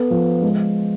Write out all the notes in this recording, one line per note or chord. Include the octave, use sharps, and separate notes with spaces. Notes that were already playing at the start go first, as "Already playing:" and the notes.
Already playing: B3 A4
F3
G#3